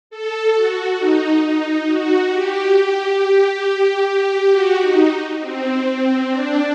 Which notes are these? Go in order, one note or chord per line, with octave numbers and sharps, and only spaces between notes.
A4
F#4
D#4
D#4
F#4
G4
F#4
D#4
C4
D4